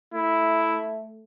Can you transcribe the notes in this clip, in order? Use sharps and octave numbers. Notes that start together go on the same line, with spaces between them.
A3 E4